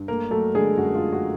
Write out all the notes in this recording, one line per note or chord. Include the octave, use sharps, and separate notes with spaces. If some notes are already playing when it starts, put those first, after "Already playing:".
Already playing: G2
A3 A#3 A#4
F#3 A3 A4
D3 G#3 G#4
F#2 F#4
F4
A3
F#4